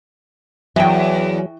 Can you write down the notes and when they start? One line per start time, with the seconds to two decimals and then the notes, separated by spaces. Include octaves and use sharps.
0.76 E2 F#3 E5 G5